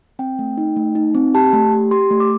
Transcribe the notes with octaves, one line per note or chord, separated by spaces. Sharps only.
C4 G5
A3
D#4
A3
D#4
C4
G4 A5
A3
G4
G4 C6
A3
D6